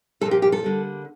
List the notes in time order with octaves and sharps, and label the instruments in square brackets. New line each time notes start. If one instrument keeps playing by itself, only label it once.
[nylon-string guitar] A#2 F3 A#3 A4
G4
G4
A4
D3 G3 A#3